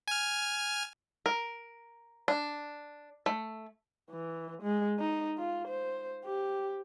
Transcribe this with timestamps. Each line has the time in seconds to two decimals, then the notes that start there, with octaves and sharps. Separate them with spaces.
0.08 G#5 F6
1.26 A#4
2.28 D4
3.26 A3
4.10 E3
4.63 G#3
4.99 D#4
5.38 F4
5.68 C5
6.25 G4